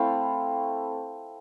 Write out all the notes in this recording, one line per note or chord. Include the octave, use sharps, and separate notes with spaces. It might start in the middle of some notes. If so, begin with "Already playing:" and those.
Already playing: A3 C4 E4 F5 G5